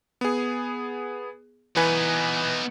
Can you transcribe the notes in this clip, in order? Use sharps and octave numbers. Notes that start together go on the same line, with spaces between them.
B3 G#4
E3 B3 D#4 B4 G#5